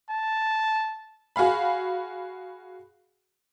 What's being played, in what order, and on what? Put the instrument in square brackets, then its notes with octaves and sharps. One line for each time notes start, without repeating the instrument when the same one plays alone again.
[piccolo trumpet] A5
[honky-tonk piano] F#4 G#4 F5 B5